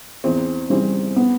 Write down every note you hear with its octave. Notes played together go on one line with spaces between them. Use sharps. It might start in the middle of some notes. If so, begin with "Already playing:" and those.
E2 C4
C#3 E3 G3 C4
B3